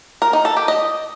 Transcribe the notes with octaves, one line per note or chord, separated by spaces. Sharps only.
A#4
D#4
A4
G4
D#5